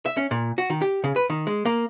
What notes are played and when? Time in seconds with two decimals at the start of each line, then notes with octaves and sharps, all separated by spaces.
0.06 E5
0.17 C#4
0.31 A#2
0.58 F#4
0.70 D#3
0.82 G4
1.04 C#3
1.16 B4
1.30 D#3
1.47 G#3
1.65 A#3